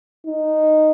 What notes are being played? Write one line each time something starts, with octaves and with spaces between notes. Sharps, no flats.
D#4